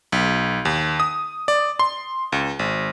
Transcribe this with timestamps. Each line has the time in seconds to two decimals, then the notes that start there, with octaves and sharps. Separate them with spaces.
0.12 B1
0.65 D#2
1.00 D#6
1.48 D5
1.79 C6
2.32 C#2
2.59 G#1